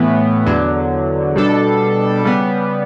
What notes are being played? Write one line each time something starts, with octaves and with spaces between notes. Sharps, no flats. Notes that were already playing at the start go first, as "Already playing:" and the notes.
Already playing: A2 E3 B3
E2 D3 F#3
B2 G3 D4 A4
C#3 G3 B3